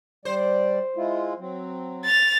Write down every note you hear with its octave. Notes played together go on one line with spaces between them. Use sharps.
G3 C5 D5
G#3 E4 F4
F#3 C4
A6 F7